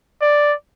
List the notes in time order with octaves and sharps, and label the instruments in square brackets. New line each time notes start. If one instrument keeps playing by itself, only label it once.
[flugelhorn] D5